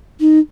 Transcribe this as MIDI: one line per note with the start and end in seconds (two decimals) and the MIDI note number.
0.20 0.39 63